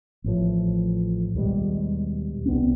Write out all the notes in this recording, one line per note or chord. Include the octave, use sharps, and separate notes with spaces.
A1 A2 F3
D#2 B2 G3 G#3
C2 B3 C4